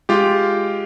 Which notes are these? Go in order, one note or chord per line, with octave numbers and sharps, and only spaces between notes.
G#3 F4 G4